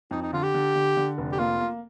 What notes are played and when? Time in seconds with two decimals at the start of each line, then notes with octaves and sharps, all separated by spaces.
0.11 F2 D#4
0.22 D#4
0.33 D3 F4
0.43 G4
0.54 D3
0.75 D3
0.97 D3
1.18 F1
1.32 G4
1.39 A#3 F4
1.60 A#3